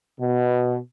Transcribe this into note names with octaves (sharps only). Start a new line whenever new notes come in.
B2